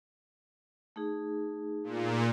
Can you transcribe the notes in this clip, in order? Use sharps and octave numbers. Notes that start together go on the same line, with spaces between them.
A3 D#4 G#4
A#2